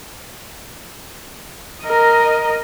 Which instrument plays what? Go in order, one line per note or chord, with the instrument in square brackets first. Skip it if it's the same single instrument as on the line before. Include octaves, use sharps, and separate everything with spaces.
[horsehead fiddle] A#4 D#5